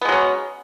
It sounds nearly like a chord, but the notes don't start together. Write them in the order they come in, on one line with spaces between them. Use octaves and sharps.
B3 G#3 F#3 C#4